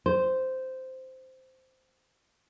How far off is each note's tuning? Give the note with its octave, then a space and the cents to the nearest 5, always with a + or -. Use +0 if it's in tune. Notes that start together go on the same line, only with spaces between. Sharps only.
C5 -10